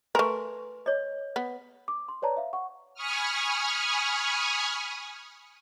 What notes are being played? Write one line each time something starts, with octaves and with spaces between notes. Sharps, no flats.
A3 A#4 B4 G#5 C6
C#5 D#5
B3
D6
C6
B4 C#5 D5 A5 A#5
E5 F5
F#5 C#6
G#5 B5 C#6 D#6 F6